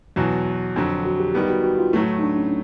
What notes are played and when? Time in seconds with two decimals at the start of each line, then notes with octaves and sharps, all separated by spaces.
0.16 E2 B2 F#3 F#4
0.76 F2 D3 F#3
1.05 F#4
1.20 G4
1.34 D#3 G3 B3 G4
1.50 F#4
1.64 F#4
1.79 F4
1.93 A2 F#3 A3 E4
2.19 D#4
2.23 D4
2.38 C#4